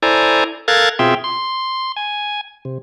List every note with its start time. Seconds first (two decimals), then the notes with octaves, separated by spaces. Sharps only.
0.02 E4 A4 C5 D5 G#5 A#5
0.68 A4 A#4 F5 F#6 G#6 A6
0.99 B2 C4 F4 G#4 E5 G5
1.24 C6
1.96 G#5
2.65 C3